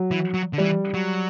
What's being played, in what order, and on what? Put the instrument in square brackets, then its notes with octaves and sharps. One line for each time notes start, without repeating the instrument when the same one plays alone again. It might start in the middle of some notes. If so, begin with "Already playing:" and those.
Already playing: [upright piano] F#3
[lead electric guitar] E3
F#3
D3
[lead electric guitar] E3 [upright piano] G3
[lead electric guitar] F#3